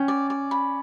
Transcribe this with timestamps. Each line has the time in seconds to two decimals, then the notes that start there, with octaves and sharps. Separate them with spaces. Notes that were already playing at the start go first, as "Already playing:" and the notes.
Already playing: C#4 G5
0.08 D5
0.30 D5
0.51 B5